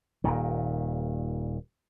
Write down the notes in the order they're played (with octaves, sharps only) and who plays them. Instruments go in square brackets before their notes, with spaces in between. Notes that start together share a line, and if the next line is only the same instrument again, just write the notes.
[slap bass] D#1 A#2 D#3